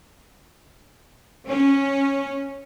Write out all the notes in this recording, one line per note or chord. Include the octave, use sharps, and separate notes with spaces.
C#4